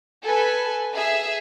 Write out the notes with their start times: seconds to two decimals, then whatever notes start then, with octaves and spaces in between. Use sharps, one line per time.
0.23 A4 B4 G#5
0.95 G#4 E5